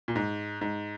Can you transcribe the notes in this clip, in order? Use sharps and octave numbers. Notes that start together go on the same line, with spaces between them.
A#2
G#2
G#2